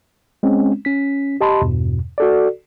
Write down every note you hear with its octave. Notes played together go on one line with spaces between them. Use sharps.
G#3 C4 C#4
C#4 B6
G4 D#5 A5 B5 C6
E2 G2 B2
F#4 A4 D5